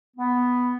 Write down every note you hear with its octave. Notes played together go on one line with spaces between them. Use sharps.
B3